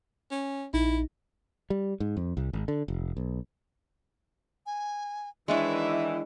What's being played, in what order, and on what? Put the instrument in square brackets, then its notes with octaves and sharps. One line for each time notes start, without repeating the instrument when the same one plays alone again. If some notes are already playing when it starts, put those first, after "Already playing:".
[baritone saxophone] C#4
[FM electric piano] A#1 D#4 [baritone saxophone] E4
[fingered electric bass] G3
G#2
F2
C2
G#1
D3
F1
B1
[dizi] G#5
[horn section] D#3 E3 [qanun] G#3 D4 C#5 [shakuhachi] E4 [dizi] E5